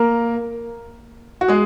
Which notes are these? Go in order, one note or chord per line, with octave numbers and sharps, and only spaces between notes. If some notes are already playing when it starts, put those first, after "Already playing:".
Already playing: A#3 A#4
F#4
G#3 G#4